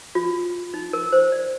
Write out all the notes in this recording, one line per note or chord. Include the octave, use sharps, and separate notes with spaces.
F4
D#4
A#4
C5
D5